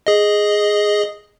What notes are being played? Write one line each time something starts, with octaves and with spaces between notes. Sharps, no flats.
G#4 D#5